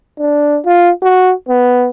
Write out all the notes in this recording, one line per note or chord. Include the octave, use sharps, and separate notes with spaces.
D4
F4
F#4
B3